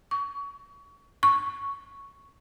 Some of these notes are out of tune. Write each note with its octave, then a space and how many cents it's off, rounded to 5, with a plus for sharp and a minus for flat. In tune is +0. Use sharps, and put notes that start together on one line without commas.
C#6 +30
C#6 +0